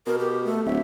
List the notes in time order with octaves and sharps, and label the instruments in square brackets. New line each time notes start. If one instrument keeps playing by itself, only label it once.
[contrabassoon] B2 [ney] A#4
[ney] G4
A3
[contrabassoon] D1 [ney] E5